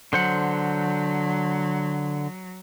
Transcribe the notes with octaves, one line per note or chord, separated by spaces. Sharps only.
D3 F#3 C5 F#5